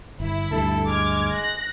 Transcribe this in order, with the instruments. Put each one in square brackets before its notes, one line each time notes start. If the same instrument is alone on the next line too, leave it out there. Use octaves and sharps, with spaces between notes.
[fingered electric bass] G1 [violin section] E4
[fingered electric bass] D2 G2 [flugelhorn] A4
[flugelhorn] G#3 [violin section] D6 F6 G#6
[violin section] F#6 A#6